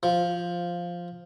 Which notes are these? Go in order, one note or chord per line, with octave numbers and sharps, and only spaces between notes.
F3